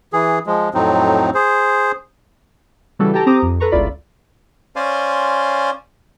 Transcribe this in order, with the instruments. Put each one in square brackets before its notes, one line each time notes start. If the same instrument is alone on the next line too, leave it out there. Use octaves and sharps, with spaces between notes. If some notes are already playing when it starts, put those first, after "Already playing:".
[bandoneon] E3 G#4
F3 G#3
F2 A2 F#3 C4 D#4
G#4 C5
[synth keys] C#3 E3 G3 F#4 A4
G4 A4 G5 A5 A#5
C4 G4 C5 A#5 D6 D#6
F2
A4 B4 A#5 C#6
G1 C#2 E4 F4 D5 B5
[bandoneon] C#4 C5 D5 F5 G#5 C6